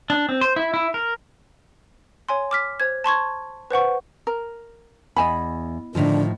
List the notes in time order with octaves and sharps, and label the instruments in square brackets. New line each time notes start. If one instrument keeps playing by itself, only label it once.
[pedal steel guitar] D4
C4
C5
E4
E4
A#4
[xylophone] C#5 G#5 C6
D6 F6 B6
C5 G#6
A5 C6 C#6 G#6
B4 C5 F#5 C#6
[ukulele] A#4
[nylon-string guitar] E2 [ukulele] D#5 G#5 B5
[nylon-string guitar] A2 D#3 F3 [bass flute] D3